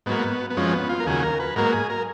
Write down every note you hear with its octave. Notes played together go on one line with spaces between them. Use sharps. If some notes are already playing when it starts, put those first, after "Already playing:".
G#2 F#3 A#3 B3
B3
F#2 F3 G#3 C#4
B3
F4
A#4
D#2 C#3 F#3 G#4
A#4
B4
G#2 F#3 A#3 A#4
G#4
A#4